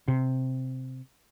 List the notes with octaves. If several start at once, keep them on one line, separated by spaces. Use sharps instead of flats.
C3